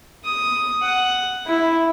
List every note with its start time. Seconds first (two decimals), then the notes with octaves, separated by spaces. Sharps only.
0.24 D#6
0.82 F#5
1.46 E4